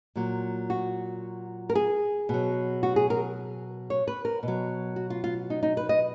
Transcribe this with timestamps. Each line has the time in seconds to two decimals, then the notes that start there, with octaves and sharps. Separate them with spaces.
0.16 A#2 F#3
0.70 F#4
1.70 A#4
1.75 G#4
2.29 B2 F#3
2.83 F#4
2.96 G#4
3.10 A#4
3.90 C#5
4.08 B4
4.25 A#4
4.43 B2
4.48 F#3
4.96 F#4
5.10 F4
5.24 F4
5.50 D#4
5.63 D#4
5.77 B4
5.89 D#5